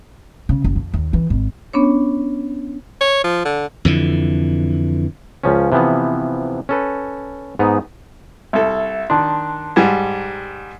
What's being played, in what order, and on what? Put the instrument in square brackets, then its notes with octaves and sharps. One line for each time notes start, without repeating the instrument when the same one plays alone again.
[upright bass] C#3
F#1
F2
D#2
E3
G#1
[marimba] B3 C#4 D4 C#5
[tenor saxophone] C#5
F3
D3
[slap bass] F2 D3 E3
[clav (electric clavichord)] C#2 F3 C#4
C3 E3 F3 B3
C#4 A4 B4
G#2 B3 D#4
[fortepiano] C2 A4 [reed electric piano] E5
[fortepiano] D#3 D4 [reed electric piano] A5 C6
[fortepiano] G#2 G3